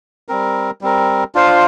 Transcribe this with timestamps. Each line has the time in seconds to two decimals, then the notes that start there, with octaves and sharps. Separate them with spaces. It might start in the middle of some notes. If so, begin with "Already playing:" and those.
0.28 G3 C4 A#4
0.81 G3 C4 A#4
1.35 D4 F4 C5 F5